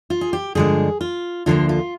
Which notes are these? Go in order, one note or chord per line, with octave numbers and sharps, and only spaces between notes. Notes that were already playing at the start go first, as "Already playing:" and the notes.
F4
G#4
G4
G2 D3 F3 G#3 G#4
F4
D2 D3 F3 A#3 F4
F4